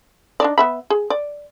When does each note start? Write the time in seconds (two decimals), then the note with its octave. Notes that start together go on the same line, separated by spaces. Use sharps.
0.40 D4 D#4 D5
0.58 B3 E5 B5
0.90 G#4
1.10 D5